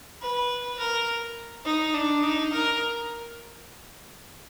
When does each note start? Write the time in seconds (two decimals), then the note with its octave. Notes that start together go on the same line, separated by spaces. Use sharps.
0.21 B4
0.79 A#4
1.65 D#4
1.94 D4
2.23 D#4
2.52 A#4